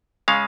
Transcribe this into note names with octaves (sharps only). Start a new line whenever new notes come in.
C#3 G#3 C#4 F5